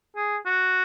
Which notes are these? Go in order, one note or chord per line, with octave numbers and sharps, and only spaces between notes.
G#4
F#4